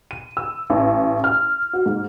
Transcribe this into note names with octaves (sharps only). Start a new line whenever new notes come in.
D#7
E6
A1
F6
F#4
G#2